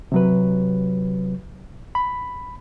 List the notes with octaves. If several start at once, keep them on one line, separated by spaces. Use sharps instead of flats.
C3 F#3 B4
B5